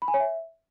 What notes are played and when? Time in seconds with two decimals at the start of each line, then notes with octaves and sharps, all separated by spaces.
0.02 B5
0.08 G#5
0.14 C#5
0.20 E5